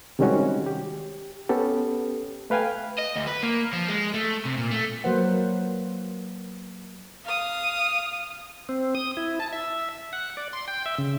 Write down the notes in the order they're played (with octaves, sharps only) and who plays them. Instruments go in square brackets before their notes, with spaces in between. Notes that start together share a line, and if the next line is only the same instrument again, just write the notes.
[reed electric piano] C3 D#3 G3 G#3 C#4 F#4
G4
B3 C#4 G4 A4
A3 B4 F5 G5 G#5
[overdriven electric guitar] D#5
D2
B4
A#3
F3
G#3
A3
C3
A#2
A3
[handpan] F#3 A#3 B4 C5 F#5
[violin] F5 D#6
[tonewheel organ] C4
D#6
E4
A5
E5
F#5
D5
C6
G5
E5
C#3